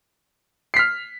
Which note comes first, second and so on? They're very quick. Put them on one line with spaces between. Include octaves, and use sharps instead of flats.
C7 B6 F6